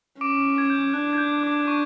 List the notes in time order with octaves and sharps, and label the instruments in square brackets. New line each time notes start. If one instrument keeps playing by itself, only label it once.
[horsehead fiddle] C#4 [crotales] D6 D7
[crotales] G#6
G6
[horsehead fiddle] D4 [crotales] F#6
[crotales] G#6
G6
D6
C#6